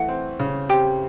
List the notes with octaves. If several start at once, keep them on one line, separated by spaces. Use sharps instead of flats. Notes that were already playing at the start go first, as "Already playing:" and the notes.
Already playing: E3 A3 F#5
C4
C#3
C4 G4 G5